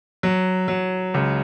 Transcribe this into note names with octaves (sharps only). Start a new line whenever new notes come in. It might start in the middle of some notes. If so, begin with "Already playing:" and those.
F#3
F#3
C#2